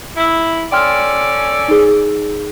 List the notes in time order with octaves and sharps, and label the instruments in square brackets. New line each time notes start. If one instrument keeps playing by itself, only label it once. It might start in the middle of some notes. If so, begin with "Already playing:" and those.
[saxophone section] E4
[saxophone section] C#4 A4 D5 [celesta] G5 C6 F6
[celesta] D#4 G#4